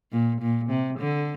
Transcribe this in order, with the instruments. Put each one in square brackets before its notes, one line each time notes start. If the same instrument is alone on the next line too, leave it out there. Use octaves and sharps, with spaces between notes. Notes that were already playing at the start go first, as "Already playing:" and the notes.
[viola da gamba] A#2
A#2
C3
D3